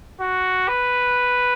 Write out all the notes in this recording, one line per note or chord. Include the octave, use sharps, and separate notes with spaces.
F#4
B4